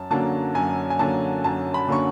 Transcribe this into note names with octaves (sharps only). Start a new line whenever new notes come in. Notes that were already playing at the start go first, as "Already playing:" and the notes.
Already playing: F#2 A5
D3 F#3 A#3 C#4 A5
F#2 G#5
G#5
D3 F#3 A#3 C#4 A5
F#2 A5
B5
D3 F#3 A#3 C#4 C#6